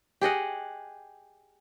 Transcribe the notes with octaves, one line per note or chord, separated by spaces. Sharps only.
G4 G#4 D#5 F#5